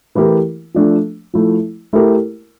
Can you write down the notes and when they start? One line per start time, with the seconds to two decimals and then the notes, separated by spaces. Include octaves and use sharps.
0.15 E3 A3 E4 G4 A#4
0.74 F3 A3 D4
1.34 F3 A3 E4
1.93 A3 E4 G4 A#4